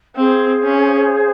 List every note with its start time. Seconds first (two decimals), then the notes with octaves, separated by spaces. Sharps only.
0.16 C4 G#4 C5 F5
0.64 C#4